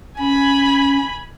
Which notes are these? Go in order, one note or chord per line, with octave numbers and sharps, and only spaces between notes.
C#4 G#5 B5